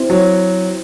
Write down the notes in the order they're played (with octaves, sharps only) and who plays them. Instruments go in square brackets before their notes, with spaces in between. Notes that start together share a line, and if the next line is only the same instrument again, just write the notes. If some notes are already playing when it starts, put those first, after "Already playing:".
Already playing: [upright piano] C4 E4
[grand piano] F#3